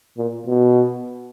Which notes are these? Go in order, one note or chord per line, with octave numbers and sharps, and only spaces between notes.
A#2
B2